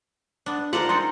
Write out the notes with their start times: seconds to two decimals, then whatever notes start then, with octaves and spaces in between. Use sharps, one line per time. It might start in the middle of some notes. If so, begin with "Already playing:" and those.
0.46 B3 D4
0.73 D4 F4 A#4 C5 F#5
0.89 G#3 C4 D#4 C6 A6 C#7